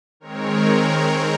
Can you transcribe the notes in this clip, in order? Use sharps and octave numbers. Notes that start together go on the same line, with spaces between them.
D#3 G#3 C4 A#4 C#5
A#4